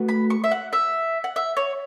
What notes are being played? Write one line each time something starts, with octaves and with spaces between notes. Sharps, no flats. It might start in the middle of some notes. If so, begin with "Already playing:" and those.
Already playing: A3 F#4 B4
B5
C#6
E5
F#5
E5
F#5
E5
C#5